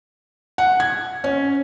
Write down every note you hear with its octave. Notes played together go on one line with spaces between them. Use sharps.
F#5
G#6
C#4